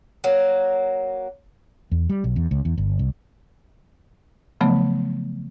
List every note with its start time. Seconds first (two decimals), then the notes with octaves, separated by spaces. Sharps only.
0.24 F#3 A#3
1.92 E2
2.10 G3
2.24 B1
2.36 E2
2.51 C#2
2.65 E2
2.78 G1
2.99 C2
4.61 C#3 F3 F#3 A3 B3